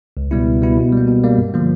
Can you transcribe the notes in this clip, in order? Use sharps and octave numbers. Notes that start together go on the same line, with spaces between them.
C#2
B2 G3 B3 E4
C#2
B2 G3 B3 E4
B2
G3 A#3
B2
G3 A#3
G2
D3 F3 A#3